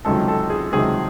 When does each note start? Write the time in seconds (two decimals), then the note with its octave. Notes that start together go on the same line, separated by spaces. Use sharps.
0.05 C#2 C3 D#3 F#3 A4
0.28 A4
0.50 G#4
0.73 C#2 C3 D#3 F#3 G#4